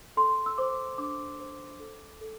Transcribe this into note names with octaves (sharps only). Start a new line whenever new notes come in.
A4 C6
E6
C5 D6
D4 D6
C5
A4
A4